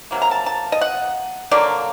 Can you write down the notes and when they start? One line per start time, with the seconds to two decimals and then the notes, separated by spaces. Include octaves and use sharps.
0.11 C3 F#3 A#3
0.22 A#5
0.31 A5
0.46 A5
0.72 D#5
0.81 F#5
1.51 D3 F#3 A#3 D5